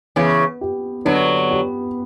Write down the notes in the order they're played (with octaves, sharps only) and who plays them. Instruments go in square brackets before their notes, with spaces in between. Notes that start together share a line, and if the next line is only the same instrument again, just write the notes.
[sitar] C#3 E3 [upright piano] B3
[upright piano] G4
[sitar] D3 F#3 [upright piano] B3
[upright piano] G4